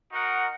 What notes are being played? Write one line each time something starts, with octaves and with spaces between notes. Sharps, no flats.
D#4 F#4 A#4 D#5 F#5